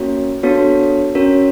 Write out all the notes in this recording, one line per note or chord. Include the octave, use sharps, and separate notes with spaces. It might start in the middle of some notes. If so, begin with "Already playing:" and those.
Already playing: A#3 C#4 F#4 A#4 C#5
B3 D4 F#4 A4 C#5
C#4 F#4 A#4 C#5